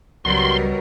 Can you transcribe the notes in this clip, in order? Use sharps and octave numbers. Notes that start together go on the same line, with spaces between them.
C#2 B2 F#3 G3 A#4 C6